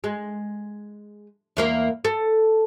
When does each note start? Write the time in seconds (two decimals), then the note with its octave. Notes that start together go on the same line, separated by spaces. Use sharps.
0.04 G#3
1.57 E2 A#3 F5
2.05 A4